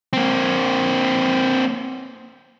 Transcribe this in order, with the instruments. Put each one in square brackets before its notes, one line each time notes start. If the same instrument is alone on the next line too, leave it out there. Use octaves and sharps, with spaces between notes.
[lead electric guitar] A#3 C4